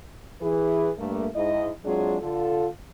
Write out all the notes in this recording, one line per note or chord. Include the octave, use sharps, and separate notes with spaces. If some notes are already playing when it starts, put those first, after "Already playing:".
E3 G#4 B4
G2 A3 A#3
G#2 E4 D#5
F#3 G#3 C4 D4 F4 G#4
D3 F4 A4